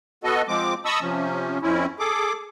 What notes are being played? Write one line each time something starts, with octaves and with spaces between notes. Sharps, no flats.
B3 F#4 A4 D#5
F3 G#3 C4 D6
D#5 A5 B5 C#6 D#6 E6
C3 F3 C#4
F2 C4 C#4 E4
G#4 A4 D6